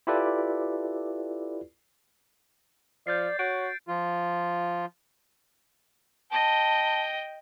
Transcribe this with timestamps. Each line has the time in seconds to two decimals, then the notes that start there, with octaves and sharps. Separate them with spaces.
0.07 E4 F4 G4 A4 B4 D5
3.07 F3 D5 G6 A6 C7
3.39 F#4 C#5 D7
3.88 F3 F4
6.32 D#5 G5 A5